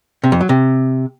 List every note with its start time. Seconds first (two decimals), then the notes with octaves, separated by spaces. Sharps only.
0.24 C3
0.32 F2
0.41 F#3
0.49 C3